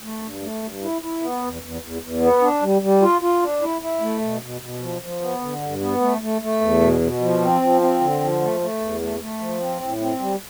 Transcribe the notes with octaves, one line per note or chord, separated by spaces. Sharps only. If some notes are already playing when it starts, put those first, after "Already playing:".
A3
G2
A3
G2
E4
E4
B3
E2
E2
E2
E2
B3
D4
G3
G3
F4
F4
D4
E4
E4
A3
B2
B2
B2
F3
F3
B3
D3
G2
B3
A3
A3
A3
E2
B2
B2
F3
C4
F3
C4
D3
F3
A3
A3
E2
A3
A3
F3
C4
A2
C4
G3